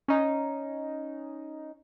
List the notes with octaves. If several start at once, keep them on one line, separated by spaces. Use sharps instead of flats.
C#4 D#4